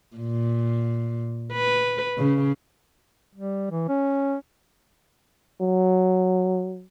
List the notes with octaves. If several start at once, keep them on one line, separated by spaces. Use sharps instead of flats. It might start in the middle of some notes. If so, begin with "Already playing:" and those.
A#2
B4
C#3
G3
E3
C#4
F#3